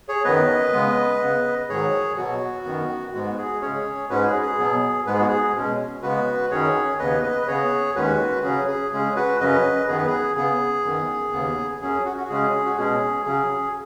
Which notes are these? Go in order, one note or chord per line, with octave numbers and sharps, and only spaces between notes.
G#4 C#5
F#2 D#3 F#3 B3 B4 D#5
C#3 G#3 B3
C#3 B3
G#2 D#3 F#3 G#4 C#5
B2 F#3 B3 F#4
F#2 D#3 B3
G#2 G#3 B3 F#4
G#4
C#3 G#3 C#4 G#4 C#5
G#2 G#3 C#4 F#4 B4
G#4
G#4
B2 F#3 B3
G#2 G#3 B3 B4
G#4
F#4
G#4
B2 G#3 C#4
C#3 G#3 B3 F#4 B4
F#2 D#3 F#3 C#4 G#4 C#5
D#2 C#3 B3 B4 D#5
B4 D#5
B4
C#3 B3 G#4 C#5
D#2 D#3 G#3 C#4 F#4 B4
C#3 F#3 C#4 G#4
G#4
C#3 G#3 C#4 G#4
F#4 B4
F#2 C#3 F#3 C#4 B4 D#5
F#2 D#3 B3 G#4
B4
G#4
C#3 B3 G#4
F#2 D#3 B3
D#2 C#3 B3
F#2 F#3 C#4 G#4
F#4
F#4
C#3 G#3 C#4 G#4
F#4
B2 G#3 C#4 G#4
C#3 F#3 C#4 G#4